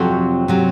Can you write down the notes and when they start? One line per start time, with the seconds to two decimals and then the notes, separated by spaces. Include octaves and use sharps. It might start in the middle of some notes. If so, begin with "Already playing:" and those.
Already playing: F2 C3 F#3 C4 F#4
0.48 C3 F#3 C4